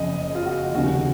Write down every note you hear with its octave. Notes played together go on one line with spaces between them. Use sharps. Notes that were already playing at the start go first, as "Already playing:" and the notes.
Already playing: F#1 F2 C#3 D#5
F4
F#4
F1 D#2 C#3 F#4